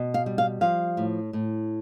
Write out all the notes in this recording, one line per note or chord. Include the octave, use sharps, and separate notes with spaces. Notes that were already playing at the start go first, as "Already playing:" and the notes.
Already playing: B2
F5
G3
F5
F3 F5
A2
A2